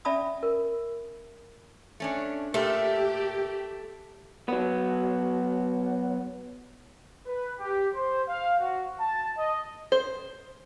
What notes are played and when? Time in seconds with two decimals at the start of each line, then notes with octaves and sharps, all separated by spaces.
0.05 C#4 D5 E5 A5 B5 D#6
0.43 A#4
2.00 A3 C#4 D4
2.54 A#2 A3 G4 A4 A#4
4.48 F#3 B3
7.27 B4
7.60 G4
7.95 C5
8.28 F5
8.61 F#4
9.01 A5
9.38 D#5
9.92 C5